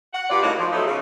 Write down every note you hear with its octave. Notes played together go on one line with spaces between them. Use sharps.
F#5
G2 F4 G4 D5
A2 C#3 A#3 D#4 F#4
F3
F3 F#3 A3 B3 D#4
C#3